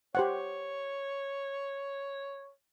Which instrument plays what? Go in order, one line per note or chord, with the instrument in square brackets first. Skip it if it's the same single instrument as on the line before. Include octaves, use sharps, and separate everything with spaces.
[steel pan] G4 C5 F#5 [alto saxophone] C#5